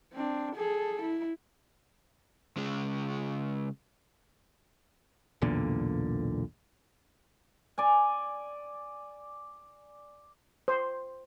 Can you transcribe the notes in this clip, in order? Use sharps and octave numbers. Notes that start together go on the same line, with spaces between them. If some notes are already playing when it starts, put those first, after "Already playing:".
C4 D4
G#4 A4
E4
C#3 G#3
B1 E2 A#2 D3
D5 G#5
C5